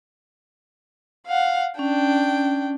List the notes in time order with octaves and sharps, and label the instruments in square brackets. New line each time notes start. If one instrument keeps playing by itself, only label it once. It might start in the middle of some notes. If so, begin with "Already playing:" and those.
[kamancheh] F5 F#5
[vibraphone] C#4 [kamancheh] D4 G5